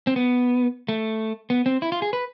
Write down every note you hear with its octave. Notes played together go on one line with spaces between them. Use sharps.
C4
B3
A3
B3
C4
E4
F4
G#4
B4